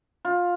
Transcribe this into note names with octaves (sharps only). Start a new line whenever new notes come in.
F4